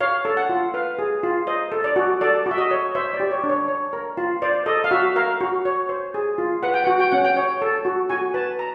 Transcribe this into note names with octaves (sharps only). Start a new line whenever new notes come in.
C#5 F5
A4
F#5
F4
B4 F5
G#4
F4
C5 D#5
A4
D5
F#4
A4 D5
F#4
E5
D#5
C#5
C5 E5
D5
G4
C#5
D4
C#5
C#5
A#4
F4
C5 D5
A4 D#5
F5
F#4 E5
A#4 F5
F#4
C#5
C5
G#4
F4
B4 F#5
G5
F#4 F#5
G5
C#4 F#5
G5
C#5
A4
F#4
F#4 G#5
B4 A5
A#5